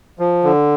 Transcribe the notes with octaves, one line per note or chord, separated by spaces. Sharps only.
F3
D3